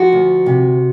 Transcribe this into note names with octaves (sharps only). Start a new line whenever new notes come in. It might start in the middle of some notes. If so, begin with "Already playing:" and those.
Already playing: F3 F#4
D2
C3